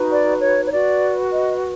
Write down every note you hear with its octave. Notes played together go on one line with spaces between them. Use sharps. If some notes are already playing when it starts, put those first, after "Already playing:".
Already playing: D#4 F#4 B4
D5
C#5
C#5
F#4 B4 D5
D#5